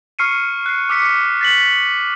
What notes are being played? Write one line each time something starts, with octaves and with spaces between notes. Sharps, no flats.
C#6 F6 C7 C#7 D#7
F#6 C7
D6 E6 B6 C#7
A6 B6 F#7